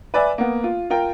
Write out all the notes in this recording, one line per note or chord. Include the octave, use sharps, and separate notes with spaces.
B4 D5 E5 G#5
A#3 B3
F4
F4 A#4 G5